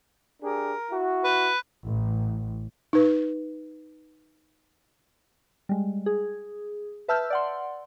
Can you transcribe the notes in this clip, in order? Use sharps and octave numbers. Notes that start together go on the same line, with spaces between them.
D4 G4 G#4 A#4
E4 F#4
B4
A1
D#4 B4
G3 G#3
G#4
B4 E5 A5 E6 F6 G6
D5 F#5 C6